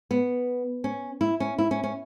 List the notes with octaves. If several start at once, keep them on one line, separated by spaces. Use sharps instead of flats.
B3
C#4
E4
C#4
E4
C#4
C#4